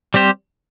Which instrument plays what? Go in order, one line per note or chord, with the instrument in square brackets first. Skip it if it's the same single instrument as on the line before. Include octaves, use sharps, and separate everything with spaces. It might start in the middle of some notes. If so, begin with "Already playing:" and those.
[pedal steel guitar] G3 C4 G4 C5